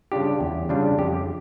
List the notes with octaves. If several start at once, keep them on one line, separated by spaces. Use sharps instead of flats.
C#3 G3 D4 F4 G4
E2
C#3 G3 D4 F4
F2 G4